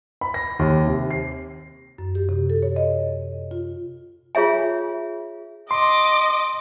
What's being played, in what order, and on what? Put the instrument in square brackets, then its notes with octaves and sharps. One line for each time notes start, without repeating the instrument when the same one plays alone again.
[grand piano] B5
A#6
D#2
C3
C7
[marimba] F#2
G4
C3
A4
C#5
D#5
F4
[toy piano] F4 G#4 C#5 E5 G#5
[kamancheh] D#5 D6 [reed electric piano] C6